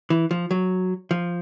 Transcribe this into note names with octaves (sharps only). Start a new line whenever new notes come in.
E3
F3
F#3
F3